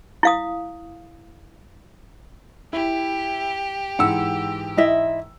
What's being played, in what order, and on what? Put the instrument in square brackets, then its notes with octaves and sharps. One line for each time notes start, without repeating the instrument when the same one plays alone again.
[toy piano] E4 F5 D#6
[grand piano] E4 [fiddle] G4
[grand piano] G#2 E3 E6 [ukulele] F#5
[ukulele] E4 D#5 E5